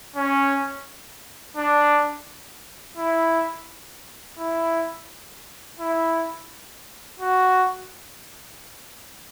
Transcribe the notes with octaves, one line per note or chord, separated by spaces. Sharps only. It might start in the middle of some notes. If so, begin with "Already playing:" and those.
C#4
D4
E4
E4
E4
F#4